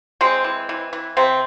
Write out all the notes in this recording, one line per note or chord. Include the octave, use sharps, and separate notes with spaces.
G#3 C4
E3
E3
E3
C3 C4